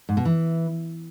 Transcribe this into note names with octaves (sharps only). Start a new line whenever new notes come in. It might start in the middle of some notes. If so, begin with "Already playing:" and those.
G#2
B2
E3